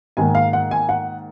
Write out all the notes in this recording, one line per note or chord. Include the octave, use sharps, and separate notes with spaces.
G#2 D#3 A#3 G#5
F5
F#5
G#5
F#5